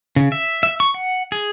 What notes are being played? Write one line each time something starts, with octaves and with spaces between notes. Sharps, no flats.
C#3
E5
E5
C#6
F#5
G#4